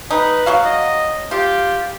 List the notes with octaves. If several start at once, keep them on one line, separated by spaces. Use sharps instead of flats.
D#4 B4
F#3 F#4 F5
D#5
F4 G4